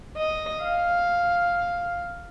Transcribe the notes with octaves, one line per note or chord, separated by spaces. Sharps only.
D#5
F5